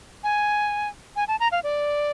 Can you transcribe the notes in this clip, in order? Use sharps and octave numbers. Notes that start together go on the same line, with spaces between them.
G#5
G#5
A5
A#5
F5
D5